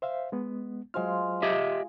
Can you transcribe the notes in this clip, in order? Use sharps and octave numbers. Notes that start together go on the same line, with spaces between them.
C5 E5 F5
G#3 B3
F#3 G#3 F4 C5 F6
G4 D#5 E5